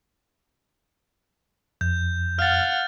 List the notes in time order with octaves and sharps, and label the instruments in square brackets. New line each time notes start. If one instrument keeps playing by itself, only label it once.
[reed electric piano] F2 [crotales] G6
[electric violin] F5 F#5 [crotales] F6 A6